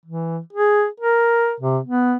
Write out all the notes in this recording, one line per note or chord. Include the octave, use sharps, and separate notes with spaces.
E3
G#4
A#4
C3
B3